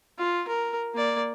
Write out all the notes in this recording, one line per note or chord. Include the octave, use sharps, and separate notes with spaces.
F4
A#4
A#3 D5